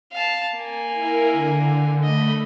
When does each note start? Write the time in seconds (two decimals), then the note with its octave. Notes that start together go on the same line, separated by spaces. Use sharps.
0.12 F5 A5
0.58 A#3 G#5
0.92 E4 A#4
1.32 D3
2.03 A3 D#5 B5